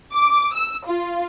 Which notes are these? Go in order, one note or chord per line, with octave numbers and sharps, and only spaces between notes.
D6
E6
F4